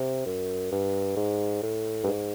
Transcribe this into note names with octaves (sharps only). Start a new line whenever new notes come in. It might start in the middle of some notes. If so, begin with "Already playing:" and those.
Already playing: C3
F#2
G2
G#2
A2
G2
G#2